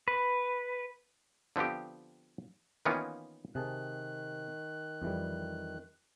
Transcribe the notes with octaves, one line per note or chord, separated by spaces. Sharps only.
B4
D3 F3 B3 C4 G4
D#3 E3 A#3 B3 C#4 F4
C3 D#3 G#4 A5 F#6
F2 E3 G3